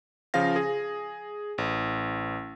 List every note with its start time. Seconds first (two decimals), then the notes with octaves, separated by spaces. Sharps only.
0.34 C#3 F3 F4 F5 A#6
0.56 G#4
1.58 A1